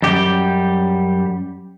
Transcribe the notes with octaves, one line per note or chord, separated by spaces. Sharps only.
F#2 G3 G4